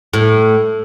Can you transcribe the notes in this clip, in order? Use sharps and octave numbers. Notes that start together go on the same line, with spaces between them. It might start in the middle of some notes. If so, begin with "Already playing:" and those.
A2